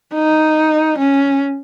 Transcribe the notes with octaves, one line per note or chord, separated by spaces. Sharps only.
D#4
C#4